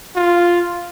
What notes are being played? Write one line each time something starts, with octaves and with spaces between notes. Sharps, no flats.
F4